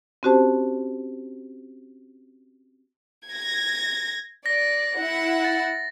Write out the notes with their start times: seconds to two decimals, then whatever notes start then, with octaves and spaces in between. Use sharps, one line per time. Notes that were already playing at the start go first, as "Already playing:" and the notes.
0.23 C4 C#4 F#4 G4 C5 A5
3.29 G#6 A#6
4.46 D5 A#6
4.97 E4 F#5
5.44 A6